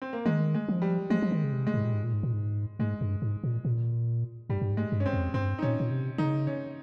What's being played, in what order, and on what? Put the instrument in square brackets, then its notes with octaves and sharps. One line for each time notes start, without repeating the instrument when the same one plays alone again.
[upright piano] C4
A#3
[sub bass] D#3 [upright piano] G#3
[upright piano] G#3
[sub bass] F3
[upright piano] G3
[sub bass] F3 [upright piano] G#3
[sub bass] F3
D#3
C#3
C3
[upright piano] G#3
[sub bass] G#2
A#2
G#2
A#2
G#2
A#2
G#2
[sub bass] G#2 [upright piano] G#3
[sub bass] G2
G#2
A#2
A#2
[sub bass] G2 [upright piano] G3
[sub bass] G2
G#2
[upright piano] G#3
[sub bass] G2
[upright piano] C#4
C4
[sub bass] F2
[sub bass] G2 [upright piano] C4
[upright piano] D#4
[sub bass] A#2 [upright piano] C#4
[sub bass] A#2
C3
[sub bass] C#3 [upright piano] D#4
[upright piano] C#4